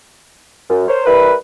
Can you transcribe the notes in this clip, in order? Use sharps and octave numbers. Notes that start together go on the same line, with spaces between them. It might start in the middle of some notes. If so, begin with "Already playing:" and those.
F#2
A#4 C5 C#5
G3 E4 A#4 B4